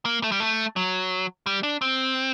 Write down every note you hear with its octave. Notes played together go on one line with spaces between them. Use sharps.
A#3
A3
G3
A3
F#3
G3
D4
C4